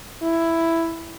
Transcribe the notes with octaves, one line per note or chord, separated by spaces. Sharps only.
E4